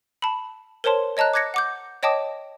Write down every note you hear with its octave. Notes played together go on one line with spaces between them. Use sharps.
A5 B5
A#4 C5 C#5 A5 C6
C#5 D#5 A5 A#5 F#6
D6 F#6 G#6 A#6 C#7
F#5 D6 G6
C#5 D#5 G5 A5 D6 D#6